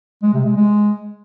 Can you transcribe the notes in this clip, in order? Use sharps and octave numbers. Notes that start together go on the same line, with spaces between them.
G#3
C3
G#3
G#3